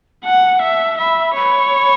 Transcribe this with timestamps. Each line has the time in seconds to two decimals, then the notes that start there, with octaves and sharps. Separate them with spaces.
0.24 F#5 A5
0.61 E5
0.98 E5 B5
1.35 C#5 B5